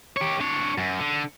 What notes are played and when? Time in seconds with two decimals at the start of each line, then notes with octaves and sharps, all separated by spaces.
0.17 G4 C#5
0.41 D4 C#5
0.78 F#2
0.99 D3